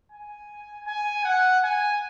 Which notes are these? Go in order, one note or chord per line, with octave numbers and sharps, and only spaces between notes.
G#5
G#5
F#5
G#5